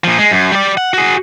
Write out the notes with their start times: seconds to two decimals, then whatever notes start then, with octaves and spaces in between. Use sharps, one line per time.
0.04 A#2 F3
0.18 G#3
0.31 F#2
0.51 G3 D5
0.77 F#5
0.94 F#4 G#4